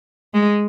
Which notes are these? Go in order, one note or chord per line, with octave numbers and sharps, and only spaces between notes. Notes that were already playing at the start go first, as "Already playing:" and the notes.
G#3